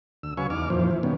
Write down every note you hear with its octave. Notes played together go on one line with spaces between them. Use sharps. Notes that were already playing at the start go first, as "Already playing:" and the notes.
D2 E6
C#3 F#3 B4 F5 G#5 C#6
E2 D#4 D6 F6
F2 A#2 E3 F3 C5
E4
B2 D#3 G3 B3 C#4